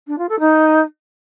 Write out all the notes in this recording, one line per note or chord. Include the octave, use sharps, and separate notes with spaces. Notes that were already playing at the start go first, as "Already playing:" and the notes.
D4
F4
A4
D#4